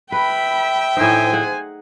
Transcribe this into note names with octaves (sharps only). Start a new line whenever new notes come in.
B4 E5 G5 B5
A2 D#4 C5 G#5
G#4 F#5